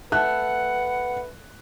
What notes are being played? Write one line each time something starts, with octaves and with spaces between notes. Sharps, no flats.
A3 B4 F#5 F#6